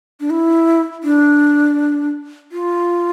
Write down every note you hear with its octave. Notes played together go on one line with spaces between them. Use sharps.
D4
E4
D4
F4